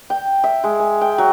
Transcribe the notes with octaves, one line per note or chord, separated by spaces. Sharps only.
G5
E5
G#3
G#5
G5
F#3